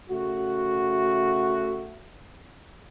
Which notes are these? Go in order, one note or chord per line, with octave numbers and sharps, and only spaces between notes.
C#3 A3 F#4